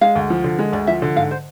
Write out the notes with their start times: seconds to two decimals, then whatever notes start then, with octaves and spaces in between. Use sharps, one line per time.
0.01 G#3 F5
0.15 D2
0.30 F3
0.44 D3
0.59 G#3
0.73 D2 D5
0.87 F3 E5
1.02 D3
1.16 G#2 F5
1.31 C5